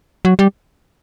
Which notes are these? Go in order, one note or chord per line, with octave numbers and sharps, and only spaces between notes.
F#3
G3